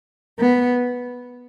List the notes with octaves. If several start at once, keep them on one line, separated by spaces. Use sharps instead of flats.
B3